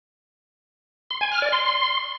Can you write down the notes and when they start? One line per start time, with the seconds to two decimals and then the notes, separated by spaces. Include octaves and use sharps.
1.11 C6
1.21 G#5
1.32 F6
1.42 D5
1.52 C6